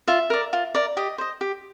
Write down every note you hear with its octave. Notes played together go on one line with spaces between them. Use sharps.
F4 E5
A#4 D5
F4
A#4 D5
G4 D#5
C5 D#5
G4